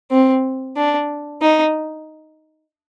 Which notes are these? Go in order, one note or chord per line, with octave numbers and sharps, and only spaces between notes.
C4
D4
D#4